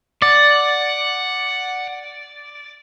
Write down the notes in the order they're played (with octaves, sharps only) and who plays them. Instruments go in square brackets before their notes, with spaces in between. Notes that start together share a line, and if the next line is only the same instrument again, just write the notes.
[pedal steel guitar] D5 [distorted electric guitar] F#5